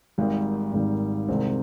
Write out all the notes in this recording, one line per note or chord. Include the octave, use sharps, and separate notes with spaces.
G#1 G#2 D#3 G3
G#1 G#2 D#3 G3
C2 C3 D#3 G#3 C4